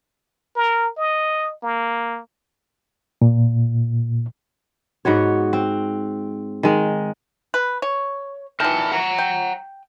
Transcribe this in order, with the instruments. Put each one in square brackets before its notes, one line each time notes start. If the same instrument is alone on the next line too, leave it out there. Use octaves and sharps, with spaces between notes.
[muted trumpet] A#4
D#5
A#3
[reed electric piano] A#2
[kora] G#2 B3 F#4 C#5
C4
D#3 G#3
[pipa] B4
C#5
[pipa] D#3 E3 [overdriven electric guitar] A#4 A5
[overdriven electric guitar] F#5 A#5
[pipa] G5